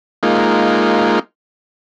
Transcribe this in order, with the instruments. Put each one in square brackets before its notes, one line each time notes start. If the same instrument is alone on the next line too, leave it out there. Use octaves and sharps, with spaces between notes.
[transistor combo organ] G#3 A#3 D#4 F4